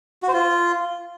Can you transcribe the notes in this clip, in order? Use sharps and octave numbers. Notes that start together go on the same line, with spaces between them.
F#4
C5
F4